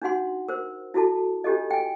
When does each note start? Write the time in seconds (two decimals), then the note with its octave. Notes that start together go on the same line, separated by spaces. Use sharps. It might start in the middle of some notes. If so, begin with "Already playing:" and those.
0.02 D4 D#4 F#4 F#5 C6
0.48 A#4 C5
0.94 E4 F#4 A4 A5
1.44 D4 F4 G4 A4 D#5
1.71 G5 G#5